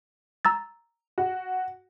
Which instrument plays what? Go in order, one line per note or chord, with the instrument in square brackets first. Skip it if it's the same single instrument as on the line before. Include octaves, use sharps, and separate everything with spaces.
[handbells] A#5 E6 A6
[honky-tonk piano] F#4